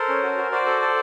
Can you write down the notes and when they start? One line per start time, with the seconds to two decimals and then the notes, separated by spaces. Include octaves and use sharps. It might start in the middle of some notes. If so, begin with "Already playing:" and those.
Already playing: A4 A#4 C5
0.09 C#4
0.23 F#4
0.38 F#4
0.51 F#4 C5 D5
0.66 A4
0.81 A4